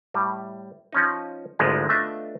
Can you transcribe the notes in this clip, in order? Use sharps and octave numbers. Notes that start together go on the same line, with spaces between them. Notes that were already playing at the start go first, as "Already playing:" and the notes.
A2 G3
F3 C#4 D#4
G#1 D2 G#2 C#3 F3 G#3
A3 B3 D4 F4 D#5 E5